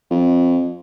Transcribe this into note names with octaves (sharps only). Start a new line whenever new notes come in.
F2